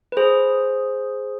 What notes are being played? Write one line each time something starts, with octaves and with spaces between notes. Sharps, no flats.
B4
G#4 C5